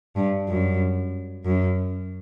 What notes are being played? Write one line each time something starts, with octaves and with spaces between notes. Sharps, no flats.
G2
F#2
F#2